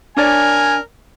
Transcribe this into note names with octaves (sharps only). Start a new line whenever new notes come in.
D4 A#4 C#5 D5 G#5